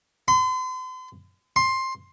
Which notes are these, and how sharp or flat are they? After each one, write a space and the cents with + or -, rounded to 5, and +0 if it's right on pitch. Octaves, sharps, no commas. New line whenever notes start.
C6 -40
C6 +15